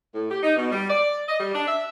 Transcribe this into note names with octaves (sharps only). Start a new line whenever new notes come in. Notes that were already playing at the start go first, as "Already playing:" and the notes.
A2
G4
D#4
B2
G3
D5
D#5
G3
D4
E5